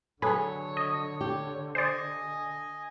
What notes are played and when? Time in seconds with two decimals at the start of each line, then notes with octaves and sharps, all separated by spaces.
0.22 D3 F#3 G#4 A4 B4 C#5
0.77 D#5
1.21 G4
1.75 C5 D5 D#5 G#5